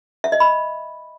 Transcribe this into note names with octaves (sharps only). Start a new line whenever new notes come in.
E5
D#5
B5